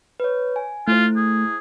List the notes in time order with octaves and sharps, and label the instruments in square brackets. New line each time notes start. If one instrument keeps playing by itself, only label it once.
[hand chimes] B4 C#5
G#5
[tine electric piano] A3 [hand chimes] E4 C5 [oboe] F4
[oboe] G#4